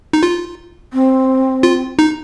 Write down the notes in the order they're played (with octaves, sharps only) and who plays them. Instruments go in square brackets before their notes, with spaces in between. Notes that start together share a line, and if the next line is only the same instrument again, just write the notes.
[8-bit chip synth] D#4
F4
[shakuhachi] C4
[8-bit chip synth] F4
D#4